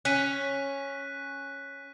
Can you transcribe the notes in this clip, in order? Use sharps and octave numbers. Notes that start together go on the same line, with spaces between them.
C#4 F#6 B6 D#7